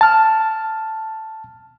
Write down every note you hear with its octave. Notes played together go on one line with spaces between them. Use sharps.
A5 F6